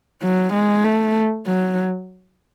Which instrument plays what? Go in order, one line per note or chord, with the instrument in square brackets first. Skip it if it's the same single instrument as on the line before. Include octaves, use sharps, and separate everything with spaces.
[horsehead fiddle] F#3
G#3
A3
F#3